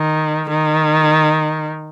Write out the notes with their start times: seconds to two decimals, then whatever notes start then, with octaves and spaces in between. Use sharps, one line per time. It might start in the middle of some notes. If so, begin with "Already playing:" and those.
Already playing: D#3
0.49 D#3